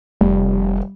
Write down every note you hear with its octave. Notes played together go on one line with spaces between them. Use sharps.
F1 G3